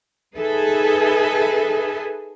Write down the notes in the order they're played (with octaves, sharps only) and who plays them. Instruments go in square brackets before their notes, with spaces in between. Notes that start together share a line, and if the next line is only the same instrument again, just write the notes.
[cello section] D#4 G#4 A4 B4 E5